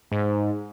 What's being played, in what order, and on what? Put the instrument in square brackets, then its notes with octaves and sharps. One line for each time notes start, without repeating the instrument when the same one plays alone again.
[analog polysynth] G#2